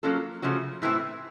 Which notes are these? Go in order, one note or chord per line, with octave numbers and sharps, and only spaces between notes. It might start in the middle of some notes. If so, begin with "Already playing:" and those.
F#3 A#3 C#4 F4 A4
C#3 F3 A3 C#4 F#4
A2 E3 A3 C4 E4